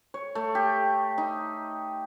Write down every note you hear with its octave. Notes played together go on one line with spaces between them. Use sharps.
C#5
A3
G4
D#4